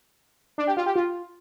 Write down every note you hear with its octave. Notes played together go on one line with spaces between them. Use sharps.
D4
G4
F4
G4
F4